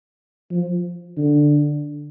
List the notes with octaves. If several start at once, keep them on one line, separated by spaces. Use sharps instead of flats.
F3
D3